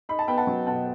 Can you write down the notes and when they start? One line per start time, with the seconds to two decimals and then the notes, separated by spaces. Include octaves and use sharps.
0.09 D#4 B5
0.19 A5
0.28 B3 G5 B5
0.38 F#5 A5
0.47 F#3
0.67 B2 F#5 A5